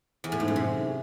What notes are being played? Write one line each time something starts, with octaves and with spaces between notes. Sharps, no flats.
E2
A2
G#2
F#2
C3